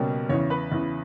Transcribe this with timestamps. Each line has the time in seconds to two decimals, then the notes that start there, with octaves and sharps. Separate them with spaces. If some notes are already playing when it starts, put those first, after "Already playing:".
Already playing: C#2 B2 G3 A#3 C#4
0.29 E2 C#3 E3 C#5
0.50 B4
0.72 E2 C#3 E3